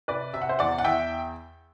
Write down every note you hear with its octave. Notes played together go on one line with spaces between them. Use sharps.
C3 B4 D5
C3 E5
F#5
C5 E5
E2 D5 F#5
F#5
E2 E5 G5